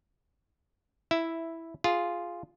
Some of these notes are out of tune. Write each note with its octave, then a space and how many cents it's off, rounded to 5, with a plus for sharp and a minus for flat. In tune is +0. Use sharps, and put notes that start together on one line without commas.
E4 +0 E5 +5
F4 +0 G#4 +0